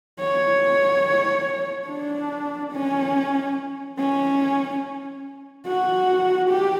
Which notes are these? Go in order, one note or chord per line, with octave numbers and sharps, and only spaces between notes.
C#5
D4
C#4
C#4
F#4
G4